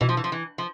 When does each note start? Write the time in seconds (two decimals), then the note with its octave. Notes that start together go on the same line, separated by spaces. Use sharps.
0.01 B2 E3
0.09 F3
0.17 E3
0.24 F3
0.32 E3
0.58 F3